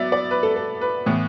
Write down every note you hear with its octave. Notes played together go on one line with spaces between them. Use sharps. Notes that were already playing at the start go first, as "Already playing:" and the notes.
Already playing: F#3 B3 D5 E5
D5
B4
A4
A4
B4
A2 E3 B3